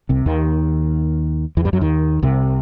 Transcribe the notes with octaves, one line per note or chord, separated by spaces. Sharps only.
C2 C3
D#2 D#3
E2 E3
G2 G3
F#2 F#3
D#2 D#3
C2 C3